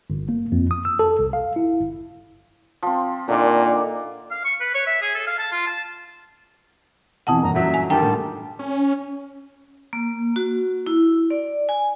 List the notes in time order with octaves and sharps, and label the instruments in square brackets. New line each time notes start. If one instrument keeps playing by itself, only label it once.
[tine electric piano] G1
A#3
F2
D#6
E6
A4
C2
F5
E4
G1
[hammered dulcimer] F3 C4
[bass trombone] A#2 [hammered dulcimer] D3 D#3 D5
[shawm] F5
C#6
B4
C#5
E5
G#4
A4
F5
A5
F4
A5
[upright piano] F2 B2 E3 [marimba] F#5 A5 D#6
[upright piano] G1 A#2 E3 [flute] A#5
[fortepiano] F#2 F#3 [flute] E5
[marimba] G#5
[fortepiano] D3 D#3 G3 [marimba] G5 A#5 [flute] A5
[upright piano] A2
[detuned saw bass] C#4
[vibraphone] A#3
F#4
E4
D5
G#5